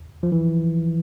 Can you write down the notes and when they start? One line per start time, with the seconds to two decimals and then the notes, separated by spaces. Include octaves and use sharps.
0.23 F3
0.32 E3